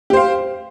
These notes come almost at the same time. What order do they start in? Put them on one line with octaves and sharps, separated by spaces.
G4 C5 F5